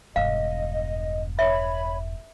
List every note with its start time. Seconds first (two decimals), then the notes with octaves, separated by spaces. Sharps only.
0.16 E1 G2 D#5 F5
1.39 C#5 E5 B5